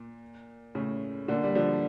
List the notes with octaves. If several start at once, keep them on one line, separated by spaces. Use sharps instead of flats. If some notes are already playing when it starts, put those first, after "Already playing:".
Already playing: A#2
A2 C#3
A#2 D3
G3
D3 F3